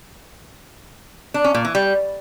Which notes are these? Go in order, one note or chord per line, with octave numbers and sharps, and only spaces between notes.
D4
C#4
A#2
E3
G3